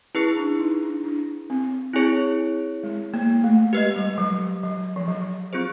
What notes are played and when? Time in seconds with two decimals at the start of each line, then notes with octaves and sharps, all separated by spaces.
0.15 C#4 E4 G#4 B4
0.37 D4
0.59 D#4
0.82 D4
1.04 D4
1.50 C4
1.93 C4 E4 G#4 C#5
2.83 G#3
3.14 A#3
3.44 A3
3.73 G#3 G4 B4 D#5
3.96 G3
4.18 F#3
4.63 F#3
4.96 F3
5.08 F#3
5.53 C4 F4 G#4 C5